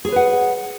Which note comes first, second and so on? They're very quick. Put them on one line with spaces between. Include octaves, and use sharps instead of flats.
G#4 C#5 B4 F#5